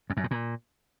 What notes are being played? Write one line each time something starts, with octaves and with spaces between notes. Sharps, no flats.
F2
F#2
A2
A#2